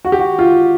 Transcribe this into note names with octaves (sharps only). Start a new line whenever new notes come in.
F#4
G4
F#4
F4